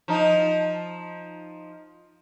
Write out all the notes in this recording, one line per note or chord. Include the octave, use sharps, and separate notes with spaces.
F3 D#4